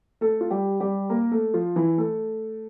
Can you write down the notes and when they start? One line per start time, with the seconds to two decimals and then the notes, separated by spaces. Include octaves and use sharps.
0.21 A3 A4
0.41 F4
0.51 G3 G4
0.80 G3 G4
1.10 A#3 A#4
1.32 A3 A4
1.54 F3 F4
1.76 E3 E4
1.98 A3 A4